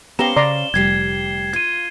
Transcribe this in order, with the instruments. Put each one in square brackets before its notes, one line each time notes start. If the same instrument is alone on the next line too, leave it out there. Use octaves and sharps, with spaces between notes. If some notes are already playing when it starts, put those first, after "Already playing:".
[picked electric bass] B3 [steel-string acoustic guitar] C#4 C5 F5 [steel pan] G4 A#5 [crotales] E7 G7
[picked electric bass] C#3 [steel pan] D5 A#5 C6
[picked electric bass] F1 [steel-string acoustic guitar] D2 G3 G4 [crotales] G#6 C7 E7
[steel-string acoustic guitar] F4 [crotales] G#6 D#7